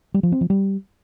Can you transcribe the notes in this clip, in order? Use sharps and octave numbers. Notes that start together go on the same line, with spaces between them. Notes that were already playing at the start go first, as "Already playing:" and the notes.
G3
F3
C4
F3
G3